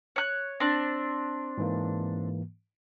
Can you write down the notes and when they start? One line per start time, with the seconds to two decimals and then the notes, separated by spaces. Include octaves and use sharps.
0.16 C#5 F#6
0.60 C4 D4
1.58 G#2 E3 A#3